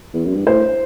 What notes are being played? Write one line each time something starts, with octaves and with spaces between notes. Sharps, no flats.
E2
F#2
G2
A2 C5